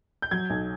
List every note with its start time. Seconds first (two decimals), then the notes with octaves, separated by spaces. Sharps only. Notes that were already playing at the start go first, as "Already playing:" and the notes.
0.22 G6
0.31 F#3 G#6
0.50 B1